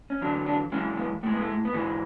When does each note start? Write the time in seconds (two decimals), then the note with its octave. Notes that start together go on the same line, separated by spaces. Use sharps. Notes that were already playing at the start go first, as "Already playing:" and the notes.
0.10 C#4
0.21 E2 D3 F#3 D4
0.46 D4
0.72 F#2 E3 G#3 C#4
0.97 B3
1.23 A2 A3
1.26 G#3
1.33 B3
1.41 A3
1.48 G#3
1.65 B3
1.73 G#2 E3 G#3 A3